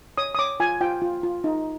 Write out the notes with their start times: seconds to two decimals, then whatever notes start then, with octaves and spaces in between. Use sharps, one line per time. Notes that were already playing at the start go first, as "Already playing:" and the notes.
0.18 C#5 D#6
0.35 D#6
0.39 C#5 D6
0.60 F4 G#5
0.81 F4 G5
1.02 F4
1.23 F4
1.44 D#4